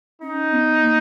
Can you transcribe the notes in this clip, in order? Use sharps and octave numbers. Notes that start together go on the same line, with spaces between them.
C#4 D#4
B3
A#3